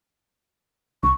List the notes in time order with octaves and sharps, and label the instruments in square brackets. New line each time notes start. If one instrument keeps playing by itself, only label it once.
[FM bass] C2 [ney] C#6